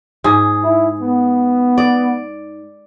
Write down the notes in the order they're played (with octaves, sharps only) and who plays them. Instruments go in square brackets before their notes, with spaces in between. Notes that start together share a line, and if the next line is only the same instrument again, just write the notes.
[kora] G#2 G#4
[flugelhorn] E4
B3
[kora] D5